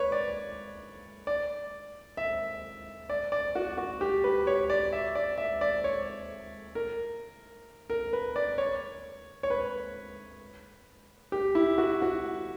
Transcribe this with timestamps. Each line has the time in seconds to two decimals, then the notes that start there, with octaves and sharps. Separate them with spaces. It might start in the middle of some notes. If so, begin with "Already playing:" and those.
Already playing: B4 C#5
0.12 D5
1.27 D5
2.17 E5
3.10 D5
3.32 D5
3.55 F#4
3.78 F#4
4.01 G4
4.24 B4
4.47 C#5
4.70 D5
4.92 E5
5.15 D5
5.38 E5
5.61 D5
5.84 C#5
6.75 A#4
7.90 A#4
8.13 B4
8.36 D5
8.58 C#5
9.43 C#5
9.50 B4
11.32 G4
11.55 E4
11.78 F#4
12.02 F#4